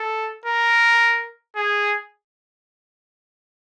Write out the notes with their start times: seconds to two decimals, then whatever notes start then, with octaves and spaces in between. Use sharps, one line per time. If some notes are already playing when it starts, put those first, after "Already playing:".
Already playing: A4
0.46 A#4
1.56 G#4